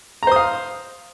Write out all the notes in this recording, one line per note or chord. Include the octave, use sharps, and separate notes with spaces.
C5 F5 A#5 D#6